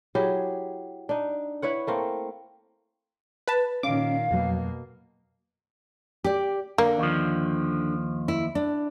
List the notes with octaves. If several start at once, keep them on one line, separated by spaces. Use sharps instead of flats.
F#3 E4 G4 G#4
D4 D#4
E4 B4 C#5 F#5
A3 A#3 C4
B4 A5
A#2 D#3 C#4 F5 D6
F2 B2 F#3 A#3
G4 D5
D3 A#3
D#2 F3
E4
D4